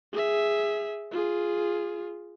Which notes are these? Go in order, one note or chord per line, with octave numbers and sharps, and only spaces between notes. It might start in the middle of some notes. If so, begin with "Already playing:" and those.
G#4 E5
F4 G#4